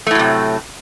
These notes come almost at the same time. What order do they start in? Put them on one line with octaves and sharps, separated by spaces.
A3 A2 F#3 C3